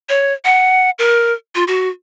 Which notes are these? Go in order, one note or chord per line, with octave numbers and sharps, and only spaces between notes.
C#5
F#5
A#4
F4
F#4